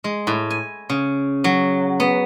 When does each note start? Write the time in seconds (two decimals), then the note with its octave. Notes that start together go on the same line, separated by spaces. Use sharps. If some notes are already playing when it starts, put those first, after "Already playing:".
0.04 G#3
0.27 A2
0.50 G#5
0.90 C#3
1.44 F#3
2.00 B3